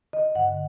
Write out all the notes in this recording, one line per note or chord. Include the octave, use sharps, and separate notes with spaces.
D#5
G2 D3 F#5